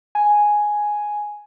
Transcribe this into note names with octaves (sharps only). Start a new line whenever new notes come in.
G#5